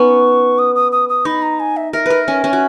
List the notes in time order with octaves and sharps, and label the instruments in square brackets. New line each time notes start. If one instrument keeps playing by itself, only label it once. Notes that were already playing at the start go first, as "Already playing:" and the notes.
Already playing: [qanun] B3 C#4 D#4 [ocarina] C#6
[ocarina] D#6
D#6
D#6
D#6
[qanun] D#4 [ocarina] B5
[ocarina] A#5
G#5
E5
[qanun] A#4 [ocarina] E5
[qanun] A#4 B4
C#4
C#4
F#4